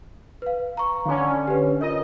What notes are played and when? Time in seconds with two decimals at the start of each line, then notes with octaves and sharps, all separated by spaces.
0.42 B4 F5
0.77 A#5 C#6
1.05 D3 C#4 F5 G#5
1.47 G4 B4
1.81 F4 A#4 C#5 D#5